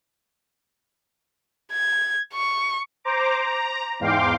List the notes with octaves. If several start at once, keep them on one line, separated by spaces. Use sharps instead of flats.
G#6
C#6
C5 A#5 D6
A#5
E2 G#2 F5 G5 C6 D6